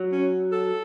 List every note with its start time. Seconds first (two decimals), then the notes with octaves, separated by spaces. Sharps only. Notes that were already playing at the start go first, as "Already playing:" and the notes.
Already playing: F#3
0.12 C#4
0.52 A4